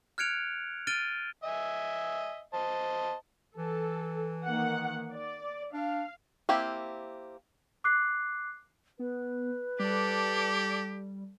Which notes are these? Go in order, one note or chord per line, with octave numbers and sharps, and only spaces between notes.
F6 F#6 G#6 C#7 D7 F7
F6 A6 D7 D#7 G7
D#5 E5 G#5
C5 D#5 A5
E3 A4
D#3 A#3 F#5
D5
D4 F5
A#3 C4 E4 G4
D6 F#6 C7
B3 B4
G3 G4 A4 D5